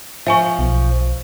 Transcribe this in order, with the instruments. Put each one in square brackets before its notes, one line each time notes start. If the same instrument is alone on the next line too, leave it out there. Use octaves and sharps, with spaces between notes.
[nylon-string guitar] F3 [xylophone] E5 G#5 C#6
[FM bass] B1